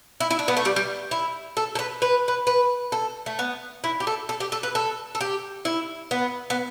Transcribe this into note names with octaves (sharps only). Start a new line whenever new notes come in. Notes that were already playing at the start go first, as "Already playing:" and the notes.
E4
E4
D4
B3
A3
G3
G3
E4
A4
A4
B4
B4
B4
B4
A4
A3
B3
E4
G4
A4
A4
G4
A4
B4
A4
A4
G4
E4
B3
B3